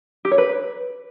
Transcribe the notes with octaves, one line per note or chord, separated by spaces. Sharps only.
G4
C#5
B4